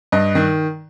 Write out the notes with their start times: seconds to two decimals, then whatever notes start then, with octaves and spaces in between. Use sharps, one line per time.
0.12 G2 D#5
0.35 D#3